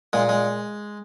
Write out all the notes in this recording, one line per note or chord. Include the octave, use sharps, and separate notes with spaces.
A#2 G#3
G#3